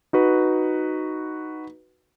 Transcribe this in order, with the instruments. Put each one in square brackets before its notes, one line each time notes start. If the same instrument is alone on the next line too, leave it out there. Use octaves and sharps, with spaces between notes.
[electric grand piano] D#4 F#4 B4